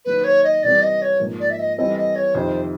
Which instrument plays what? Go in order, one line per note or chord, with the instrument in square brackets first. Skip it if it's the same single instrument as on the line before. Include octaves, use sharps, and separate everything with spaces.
[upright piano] D#3 F#3 A#3 [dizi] B4
[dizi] C#5
D#5
[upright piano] C3 E3 G3 C4 [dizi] D5
[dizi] D#5
C#5
[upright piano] G#2 F3 A#3
[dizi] D5
E5
D#5
[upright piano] E3 G3 C4 E4 A4 [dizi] D#5
[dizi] D#5
C#5
[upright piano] F2 C3 D#3 [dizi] C5